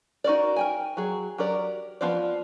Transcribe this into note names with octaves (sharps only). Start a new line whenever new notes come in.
D#4 F#4 A#4 D5
A#4 G5 G#5
F#3 G#4
F#3 G4 A#4 D5
F3 B3 F4 C5 D5